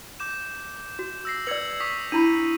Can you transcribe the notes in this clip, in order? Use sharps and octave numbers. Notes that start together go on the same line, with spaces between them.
D6 G6 E7
F#4
E6 A#6 C7
B4 D5 G#6 C#7 F#7
C#6 D#6 B6
D4 E4 B5 D#7